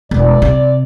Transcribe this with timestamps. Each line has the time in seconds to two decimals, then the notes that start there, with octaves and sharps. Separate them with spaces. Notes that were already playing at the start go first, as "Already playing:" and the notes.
0.11 E1 D5
0.42 C3